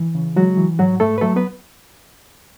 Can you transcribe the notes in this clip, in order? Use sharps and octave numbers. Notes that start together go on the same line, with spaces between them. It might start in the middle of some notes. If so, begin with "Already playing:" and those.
Already playing: E3
C#3
F#3 G#3 F#4
E3
G#2 F#3 F#4
G#2 A3 A4
B4
F#3 A3 A4
B3 B4